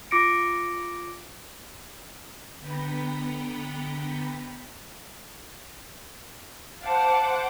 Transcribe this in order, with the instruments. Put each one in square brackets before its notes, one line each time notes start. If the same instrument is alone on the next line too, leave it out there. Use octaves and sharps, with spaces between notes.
[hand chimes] F4 D6 A#6 C#7 D7
[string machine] D3 B3 G5 A#5 B5
[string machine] C5 F#5 D6 [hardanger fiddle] F5 A5